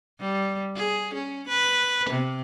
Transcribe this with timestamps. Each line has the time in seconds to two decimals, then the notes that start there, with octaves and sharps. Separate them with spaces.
0.20 G3
0.76 G#4
1.14 C#4
1.48 B4
2.10 C3